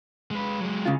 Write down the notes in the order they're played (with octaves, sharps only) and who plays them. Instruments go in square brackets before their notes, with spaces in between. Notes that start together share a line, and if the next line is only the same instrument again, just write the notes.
[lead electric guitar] G#3 B4
F#3 G#3
[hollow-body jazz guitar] C#3 F4